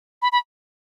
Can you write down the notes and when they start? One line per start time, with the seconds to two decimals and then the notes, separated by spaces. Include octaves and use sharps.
0.22 B5
0.32 B5